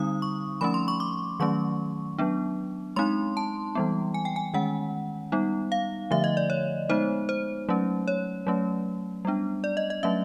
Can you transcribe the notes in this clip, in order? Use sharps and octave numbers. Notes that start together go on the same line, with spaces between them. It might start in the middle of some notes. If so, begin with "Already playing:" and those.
Already playing: D3 G3 C4 D#4 D#6
C#6
F3 A3 C#4 B5
C6
C#6
D6
D#3 F#3 A3 C#4 C#6
F#3 B3 D4
G#3 C4 D#4 C6
A5
E3 G3 B3
G#5
G5
G#5
D#3 G#3 C#4 F#5
G3 B3 D#4
F5
D3 F3 A3 E5
D#5
D5
C#5
G#3 B3 D#4 C5
C5
F#3 A3 C#4
C#5
F#3 A3 C#4
G3 B3 D4
D5
D#5
D#5
F#3 A3 C#4 E5